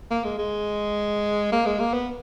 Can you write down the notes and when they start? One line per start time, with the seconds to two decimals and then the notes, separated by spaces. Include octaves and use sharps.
0.11 A#3
0.24 G#3
0.38 G#3
1.52 A#3
1.66 G#3
1.79 A#3
1.93 B3